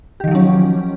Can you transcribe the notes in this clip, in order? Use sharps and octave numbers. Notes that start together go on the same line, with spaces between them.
D#3 F3 F#3 C#4 G4